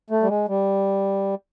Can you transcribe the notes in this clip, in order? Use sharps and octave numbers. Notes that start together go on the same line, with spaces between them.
A3
G3
G#3
G3